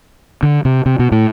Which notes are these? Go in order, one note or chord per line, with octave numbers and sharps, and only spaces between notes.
D3
C3
C3
B2
A2